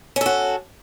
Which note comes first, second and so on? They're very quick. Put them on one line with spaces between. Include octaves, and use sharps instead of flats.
C#4 A4 F#4